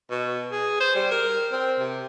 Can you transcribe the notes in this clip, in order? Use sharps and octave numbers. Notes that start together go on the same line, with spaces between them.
B2
G#4
C5
G3
A#4
C4
C3